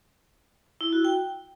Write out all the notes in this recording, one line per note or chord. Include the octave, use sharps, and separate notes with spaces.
E4
F#4
G5